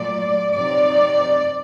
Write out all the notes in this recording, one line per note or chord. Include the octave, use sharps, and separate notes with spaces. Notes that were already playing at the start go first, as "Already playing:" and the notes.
Already playing: A#2 F#3 A3 D5
C3 F#3 C4 D#4 D5